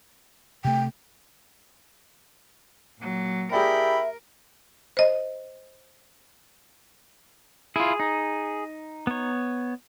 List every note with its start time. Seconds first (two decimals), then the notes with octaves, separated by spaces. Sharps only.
0.65 C3 A3 G5
2.98 A#2 F#3
3.52 E4 G4 G#4 A#4 D5 E5 G5 B5
4.97 C5 D#5
7.76 E4 F4 G#4
8.00 D#4
9.07 B3 C#5